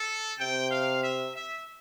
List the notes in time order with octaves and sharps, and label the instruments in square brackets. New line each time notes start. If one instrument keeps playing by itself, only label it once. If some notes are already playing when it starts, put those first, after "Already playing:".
Already playing: [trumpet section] A4
[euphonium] C3 [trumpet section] G5
[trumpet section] F5
E5
E5